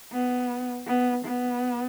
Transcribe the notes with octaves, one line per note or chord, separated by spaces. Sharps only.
B3
B3
B3